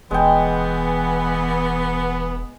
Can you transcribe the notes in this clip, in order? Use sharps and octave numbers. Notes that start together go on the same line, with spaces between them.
E1 E3 G#3 B3 G5